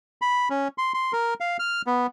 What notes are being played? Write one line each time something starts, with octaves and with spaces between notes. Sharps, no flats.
B5
C#4
C6
C6
A#4
F5
F6
B3